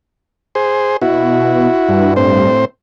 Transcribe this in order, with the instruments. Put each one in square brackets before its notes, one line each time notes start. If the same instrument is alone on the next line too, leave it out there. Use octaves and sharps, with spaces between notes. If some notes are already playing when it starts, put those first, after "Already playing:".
[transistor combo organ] G#4 C5
[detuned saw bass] B2 [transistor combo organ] E4 F#4
[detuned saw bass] G2
[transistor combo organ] A2 C4 C5